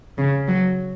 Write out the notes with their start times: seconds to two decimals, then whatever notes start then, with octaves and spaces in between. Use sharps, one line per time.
0.18 C#3
0.48 F#3